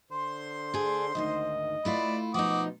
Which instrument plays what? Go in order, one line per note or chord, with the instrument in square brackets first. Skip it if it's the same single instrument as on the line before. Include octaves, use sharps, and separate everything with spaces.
[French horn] D3 [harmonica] C5 C6
[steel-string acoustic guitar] D4 G#4
[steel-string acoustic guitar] D2 G#2 D#3 [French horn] D#5
[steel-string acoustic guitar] A3 E4 F4 [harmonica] B4 D5
[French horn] B2 [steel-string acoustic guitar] F3 D#4 [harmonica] F#4 D6 D#6